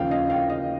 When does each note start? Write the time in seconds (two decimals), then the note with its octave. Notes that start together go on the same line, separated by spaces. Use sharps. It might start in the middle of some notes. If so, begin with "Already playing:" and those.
Already playing: D#2 C#3 F3 F5 G5
0.11 D#5 F5
0.30 F5 G5
0.49 D#5 F5